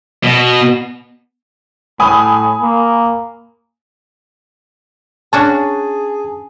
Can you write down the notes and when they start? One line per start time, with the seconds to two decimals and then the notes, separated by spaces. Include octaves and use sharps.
0.24 B2
2.00 A2 G#5 B5 D#6
2.61 A#3
5.33 C#4 D4 F#4 G#4 A5